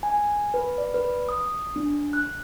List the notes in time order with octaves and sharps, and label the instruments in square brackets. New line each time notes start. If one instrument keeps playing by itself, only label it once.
[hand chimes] G#5
B4
D5
B4
D#6
D4
F#6